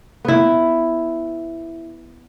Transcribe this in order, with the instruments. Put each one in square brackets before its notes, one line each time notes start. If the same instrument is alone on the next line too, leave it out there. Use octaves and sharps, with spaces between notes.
[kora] B3 E4